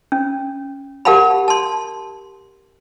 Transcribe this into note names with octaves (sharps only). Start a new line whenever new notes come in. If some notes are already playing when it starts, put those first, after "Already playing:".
C#4
G4 A#4 F5 F#5 A5 B5
A5 C6